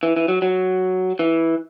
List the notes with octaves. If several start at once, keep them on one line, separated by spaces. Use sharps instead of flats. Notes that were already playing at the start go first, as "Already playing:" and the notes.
E3
E3
F#3
F#3
E3